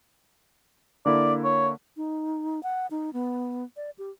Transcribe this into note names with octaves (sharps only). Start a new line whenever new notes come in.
D3 A#3 E4 D5
C#5
D#4
F#5
D#4
B3
D5
G4